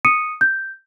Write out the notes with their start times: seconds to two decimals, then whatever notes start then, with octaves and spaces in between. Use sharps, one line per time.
0.05 D#6 C#7 D#7
0.41 G6